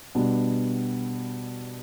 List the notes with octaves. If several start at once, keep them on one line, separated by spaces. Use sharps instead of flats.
B2 G3 B3 D4